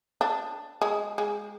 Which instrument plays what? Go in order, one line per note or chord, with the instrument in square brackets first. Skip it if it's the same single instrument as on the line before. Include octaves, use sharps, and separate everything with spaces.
[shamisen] D4
G#3
G#3